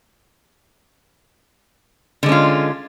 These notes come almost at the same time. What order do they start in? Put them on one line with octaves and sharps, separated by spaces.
D3 G#3 C#4 F4